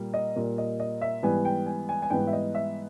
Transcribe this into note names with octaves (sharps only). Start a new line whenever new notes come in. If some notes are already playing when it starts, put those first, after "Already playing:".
Already playing: A#2 G3 A#3
D#5
A#2 G3 A#3
D#5
D#5
E5
G#2 E3 G3 B3 G#5
G5
G#5
G#5
G#5
G#2 E3 G3 B3 G5
E5
D#5
E5